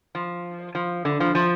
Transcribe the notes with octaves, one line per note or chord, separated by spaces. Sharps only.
F3
F3
D3
F3
F3